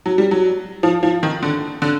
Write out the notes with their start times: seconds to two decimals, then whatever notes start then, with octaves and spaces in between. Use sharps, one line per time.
0.06 F#3
0.18 G3
0.31 F#3
0.83 F3
1.03 F3
1.23 D#3
1.43 D3
1.82 D3